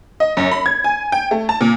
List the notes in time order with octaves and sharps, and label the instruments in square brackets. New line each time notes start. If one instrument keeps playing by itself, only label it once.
[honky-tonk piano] D#5
F#2
B5
G#6
G#5
G5
A3
A5
A#2